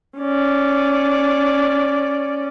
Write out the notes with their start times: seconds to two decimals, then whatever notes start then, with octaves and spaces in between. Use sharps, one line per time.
0.18 C#4 D5